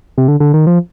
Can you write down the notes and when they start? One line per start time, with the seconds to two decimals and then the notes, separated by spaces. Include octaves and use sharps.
0.18 C3
0.28 D3
0.40 D3
0.54 D#3
0.67 F3